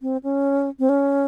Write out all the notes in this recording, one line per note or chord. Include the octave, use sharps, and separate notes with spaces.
C4
C#4
C4
C#4